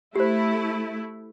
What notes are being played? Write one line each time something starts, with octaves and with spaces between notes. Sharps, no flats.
A3 E4 G4 C5